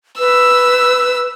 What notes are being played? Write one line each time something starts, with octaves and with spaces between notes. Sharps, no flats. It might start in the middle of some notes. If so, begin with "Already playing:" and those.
B4 E6